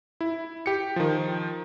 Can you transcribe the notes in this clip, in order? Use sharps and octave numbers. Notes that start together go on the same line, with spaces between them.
E4
G4 C#7
D#3 F3